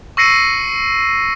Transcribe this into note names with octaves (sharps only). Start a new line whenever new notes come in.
C#6 E6 A#6 C7 C#7 D#7